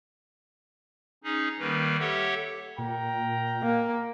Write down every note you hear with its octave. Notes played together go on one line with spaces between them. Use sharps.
C#4 D#4 G#4
D#3 G3 A#3 B4
G4 A4 C#5 E5 F#5
A#2 A#4 G5 A#5
A#3